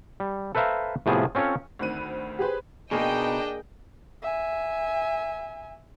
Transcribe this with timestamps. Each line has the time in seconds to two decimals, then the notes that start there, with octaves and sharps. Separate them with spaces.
0.20 G3
0.55 A4 B4 C5 E5 F5 A#5
1.06 A2 C3 F3 B3 G#4 A5
1.35 C4 C#4 F4 A4 C#5
1.79 D2 D#3 C4 B5 F#6 D#7
2.39 G4 G#4 B4 C5
2.91 B2 A#3 D4 D#4 G#4 D#5 G5
4.22 E5 G#5